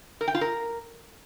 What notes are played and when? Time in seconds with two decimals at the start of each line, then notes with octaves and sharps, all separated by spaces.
0.21 A#4
0.28 G5
0.34 F4
0.41 A#4